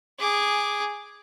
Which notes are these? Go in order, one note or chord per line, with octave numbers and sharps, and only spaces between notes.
G#4 D6